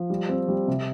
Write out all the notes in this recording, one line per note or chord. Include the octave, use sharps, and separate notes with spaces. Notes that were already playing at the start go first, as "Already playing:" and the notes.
Already playing: F3
G3
C4
G3
C3